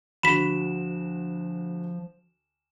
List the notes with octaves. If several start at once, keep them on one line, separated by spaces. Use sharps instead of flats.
D2 F3 F#4 B5 B6 E7